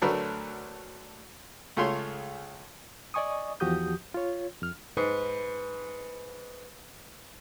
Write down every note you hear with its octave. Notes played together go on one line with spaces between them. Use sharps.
D2 F#3 A3 D4 A#4 B4
C#2 A3 F4 G#4 C#5 C6
D5 D#5 G#5 C#6 D#6
E2 F3 F#4 G4 D#6 G6
F4 C#5
F2 F6
G#2 B4